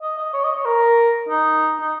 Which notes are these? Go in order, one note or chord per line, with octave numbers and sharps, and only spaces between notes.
D#5
D#5
C#5
D#5
C#5
A#4
D#4
D#4